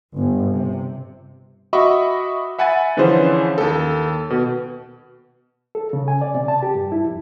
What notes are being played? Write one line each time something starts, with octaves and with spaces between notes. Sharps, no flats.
G1
C3
F#4 D#5 E5 B5 C#6 D6
E5 F#5 G#5 B5 A6 D#7
D3 E3 F3 C#4 G#4 C5
D#2 A4
B2
A4
C#3
G#5
D5
C3
A5
G4
G2
E4
F2